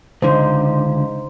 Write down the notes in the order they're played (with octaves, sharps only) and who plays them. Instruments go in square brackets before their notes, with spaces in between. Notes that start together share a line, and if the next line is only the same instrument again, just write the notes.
[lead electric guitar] C#2 D3 [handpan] D#4 C5